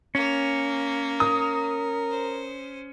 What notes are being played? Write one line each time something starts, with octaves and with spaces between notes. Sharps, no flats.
A#3 C#4
A#4 D#6
C5